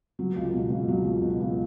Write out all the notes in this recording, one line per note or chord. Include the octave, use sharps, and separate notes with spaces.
F#3
C#2
B2
C#2
F#3
C#2
B2
C#2